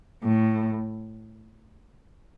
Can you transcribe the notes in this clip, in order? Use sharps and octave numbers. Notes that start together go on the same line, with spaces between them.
A2